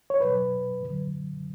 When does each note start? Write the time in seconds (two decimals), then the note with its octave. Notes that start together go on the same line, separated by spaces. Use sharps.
0.10 C#5
0.21 E2 B2 F#3 B4
0.82 E2 D3 F#3